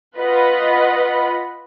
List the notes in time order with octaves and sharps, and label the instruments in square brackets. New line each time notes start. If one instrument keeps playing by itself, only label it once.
[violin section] F4 B4 D#5 F#5 B5